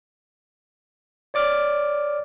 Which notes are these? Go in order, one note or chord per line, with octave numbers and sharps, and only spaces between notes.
C#5 D5 D6 F6